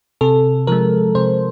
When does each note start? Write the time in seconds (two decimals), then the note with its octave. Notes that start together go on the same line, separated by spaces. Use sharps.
0.21 C3 A4
0.67 F3 G#3 A#4
1.15 C3 C5